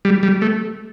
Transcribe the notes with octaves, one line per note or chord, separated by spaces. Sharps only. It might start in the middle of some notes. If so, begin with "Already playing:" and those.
G3
G3
A3